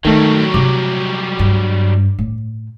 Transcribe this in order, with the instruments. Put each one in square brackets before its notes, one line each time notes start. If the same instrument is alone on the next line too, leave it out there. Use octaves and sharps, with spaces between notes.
[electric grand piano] D#3 A3 [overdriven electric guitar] F#3 G3 [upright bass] D#4
[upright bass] C3 [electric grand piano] D6
[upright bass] G2
A2